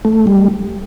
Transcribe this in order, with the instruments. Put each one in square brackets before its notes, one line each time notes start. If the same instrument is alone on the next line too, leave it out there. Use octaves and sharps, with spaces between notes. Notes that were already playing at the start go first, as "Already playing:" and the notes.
[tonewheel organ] A3
G3